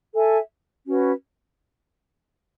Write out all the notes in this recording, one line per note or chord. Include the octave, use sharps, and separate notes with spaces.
A4 E5 G#5
C#4 F#4 B4